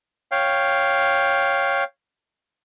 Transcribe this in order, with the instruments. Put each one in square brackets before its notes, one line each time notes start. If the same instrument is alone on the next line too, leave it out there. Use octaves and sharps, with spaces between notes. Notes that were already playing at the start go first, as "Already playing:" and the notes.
[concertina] C#5 F5 G5